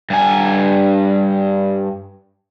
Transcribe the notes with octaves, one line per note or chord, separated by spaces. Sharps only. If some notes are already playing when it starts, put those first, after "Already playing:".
G2 G#5